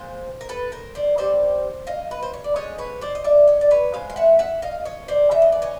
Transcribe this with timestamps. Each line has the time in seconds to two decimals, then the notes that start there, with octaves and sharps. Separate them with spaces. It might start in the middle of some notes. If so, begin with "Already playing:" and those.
Already playing: A#2 F3 G#3 C5
0.41 A#4
0.49 A4 B4
0.72 A#4 C5
0.95 C5 D5
1.18 D#3 G3 C4 C5 D5
1.87 D#5 F5
2.11 B4
2.22 C5
2.34 C#5
2.44 D5
2.56 D3 F3 G#3 C#5 D#5
2.78 B4 C#5
3.01 C5 D5
3.15 D#5
3.24 D5 E5
3.48 C#5 D#5
3.61 D5
3.71 B4 C#5
3.94 E3 G#3 C4 F5
4.10 F5
4.16 E5 F#5
4.39 E5 F#5
4.62 D#5 F5
4.85 C#5 D#5
5.08 C5 D5
5.31 C#3 E3 E5
5.42 D#5
5.52 D5
5.62 C#5 D#5